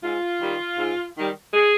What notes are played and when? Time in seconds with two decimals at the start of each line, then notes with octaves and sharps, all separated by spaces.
0.03 G#2 F4
0.41 D#3 G3
0.78 G#2
1.16 D#3 G3
1.53 G#4